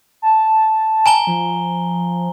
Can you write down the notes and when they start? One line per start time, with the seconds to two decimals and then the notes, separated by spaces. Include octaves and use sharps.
0.22 A5
1.06 G#5 A#5 G7
1.27 F3